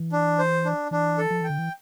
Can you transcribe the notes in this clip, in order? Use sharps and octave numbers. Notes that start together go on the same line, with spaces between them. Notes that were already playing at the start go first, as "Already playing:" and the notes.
Already playing: E3
D4
C5
D4
E3 D4
A4
F3
E3 G5
D3
E3